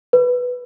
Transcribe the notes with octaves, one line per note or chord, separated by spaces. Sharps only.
B4